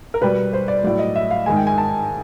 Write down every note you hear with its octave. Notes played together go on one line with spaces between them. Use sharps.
A#4
B2 G3 B4
C5
D5
A2 F#3 D5
D#5
E5
F5
G#2 D#3 G#3 G#5
G5
G#5
A5